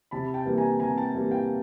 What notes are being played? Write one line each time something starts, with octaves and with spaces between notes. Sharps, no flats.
C3 A5 B5
G5 A5
E3 G3 A#3
G#5 A#5
C3 G#5 A#5
G5 A5
E3 G3 A#3
F5 G5